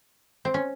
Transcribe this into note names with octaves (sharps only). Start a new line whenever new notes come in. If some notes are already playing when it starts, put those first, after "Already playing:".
C4
C#4